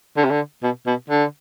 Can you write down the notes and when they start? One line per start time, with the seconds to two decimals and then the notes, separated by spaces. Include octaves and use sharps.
0.17 D3
0.24 C3
0.31 D3
0.63 B2
0.87 B2
1.10 D3